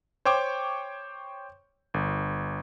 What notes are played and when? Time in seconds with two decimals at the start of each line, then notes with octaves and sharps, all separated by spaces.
0.25 C5 C#5 G5 C#6 D6
1.94 G1